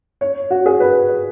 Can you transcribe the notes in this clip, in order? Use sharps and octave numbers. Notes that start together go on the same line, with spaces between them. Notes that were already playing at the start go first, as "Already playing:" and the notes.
C#5
F#4
G#4
B4